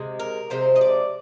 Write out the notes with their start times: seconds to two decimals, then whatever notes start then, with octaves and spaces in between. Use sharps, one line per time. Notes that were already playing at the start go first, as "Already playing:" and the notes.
Already playing: C3 G#3
0.19 A#4
0.50 C3 F3 G#3 C5
0.76 D#5
0.81 D5